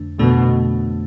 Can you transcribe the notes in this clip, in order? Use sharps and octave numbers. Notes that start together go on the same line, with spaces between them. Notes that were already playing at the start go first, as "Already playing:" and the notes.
Already playing: F2 D3 A3 D4
F2 B2 D3 A3 D4